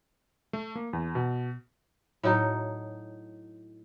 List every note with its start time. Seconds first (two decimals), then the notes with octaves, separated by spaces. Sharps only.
0.53 A3
0.75 A#3
0.93 E2
1.15 B2
2.23 A2 F#3 D#4